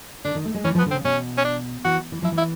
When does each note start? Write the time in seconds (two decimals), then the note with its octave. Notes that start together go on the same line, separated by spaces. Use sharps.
0.25 D3 D4
0.35 D#3
0.45 A3
0.54 G#3
0.64 E3 C#4
0.75 F3 B3
0.86 D3
0.91 C4
0.94 C#3
1.04 B2 C#4
1.38 C#4
1.45 D4
1.85 E3 F#4
2.12 E3
2.22 F3 E4
2.32 E3
2.38 E4